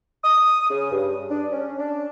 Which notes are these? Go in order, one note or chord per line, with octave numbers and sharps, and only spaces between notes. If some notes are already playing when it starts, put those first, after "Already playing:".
D#6
C#3
G2
D4
C#4
D4